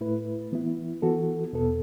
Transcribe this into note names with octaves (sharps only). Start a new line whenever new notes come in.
A2 A3 E4 B4
E3 B3 E4
E3 B3 F#4 A4
E2 B2 B3 A4